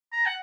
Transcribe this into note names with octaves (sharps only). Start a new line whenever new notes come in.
A#5
F#5